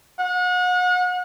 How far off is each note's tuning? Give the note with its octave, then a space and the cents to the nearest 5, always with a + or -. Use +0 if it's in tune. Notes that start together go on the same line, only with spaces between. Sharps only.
F#5 -35